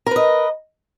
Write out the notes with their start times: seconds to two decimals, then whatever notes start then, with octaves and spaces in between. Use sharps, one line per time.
0.06 A#4
0.11 B4
0.16 D#5